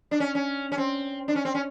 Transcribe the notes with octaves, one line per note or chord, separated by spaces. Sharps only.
D4
C#4
C#4
C#4
C4
D4
C#4
C4
C#4